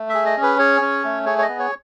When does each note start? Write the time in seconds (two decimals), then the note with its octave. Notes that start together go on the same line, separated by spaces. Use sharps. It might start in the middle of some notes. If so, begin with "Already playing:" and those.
Already playing: A3
0.09 E5
0.15 G#4
0.26 D#5
0.37 C#4
0.43 B4
0.59 G#4 C#5
0.81 C#4
1.04 A3
1.26 G#4 C#5
1.38 C#5
1.42 D#5
1.49 B3
1.59 C#5